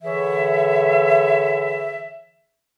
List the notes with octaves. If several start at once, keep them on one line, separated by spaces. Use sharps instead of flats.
D3 E3 G#4 C#5 E5